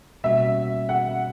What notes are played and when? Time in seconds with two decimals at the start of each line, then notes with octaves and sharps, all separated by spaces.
0.24 B2 G3 A#3 C#4 F#4 E5
0.89 F#5